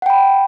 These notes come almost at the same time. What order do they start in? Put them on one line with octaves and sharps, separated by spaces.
F#5 G5 B5